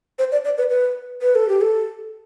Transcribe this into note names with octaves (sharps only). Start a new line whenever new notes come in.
C5
D5
D5
B4
B4
B4
A4
G4
A4